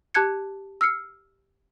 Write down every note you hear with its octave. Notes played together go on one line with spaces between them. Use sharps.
G4 A5 F#6 G#6 C#7
E6 F6 C7 C#7